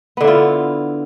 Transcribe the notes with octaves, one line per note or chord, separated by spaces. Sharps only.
D3 B3 E4 F4